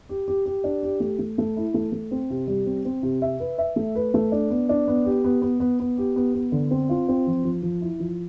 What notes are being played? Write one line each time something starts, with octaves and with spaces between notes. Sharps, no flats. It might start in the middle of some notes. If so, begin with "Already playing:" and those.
G4
G4
G4
D4
G4
A3
A3
A3
E4
A3
A3
C4
C3
G3
C4
C4
C3
E5
B4
E5
A3
B4
A3
D4
B3
D4
B3
G4
B3
B3
B3
B3
G4
B3
B3
D3
C4
F4
C4
F3
F3
F3
E4
F3